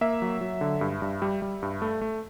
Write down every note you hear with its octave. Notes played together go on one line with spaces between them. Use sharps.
A#3 E5
F#3
F#3
D3
G2
G2
G3
G3
G2
A3
A3